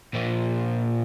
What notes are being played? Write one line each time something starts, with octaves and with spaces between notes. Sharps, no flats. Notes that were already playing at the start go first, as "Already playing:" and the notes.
A#2 F3